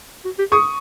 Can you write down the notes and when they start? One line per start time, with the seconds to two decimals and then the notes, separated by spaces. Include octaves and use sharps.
0.25 F#4
0.39 G4
0.51 G#4 C#6 D#6